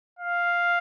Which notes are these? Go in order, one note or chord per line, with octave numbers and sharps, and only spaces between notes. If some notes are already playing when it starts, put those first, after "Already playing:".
F5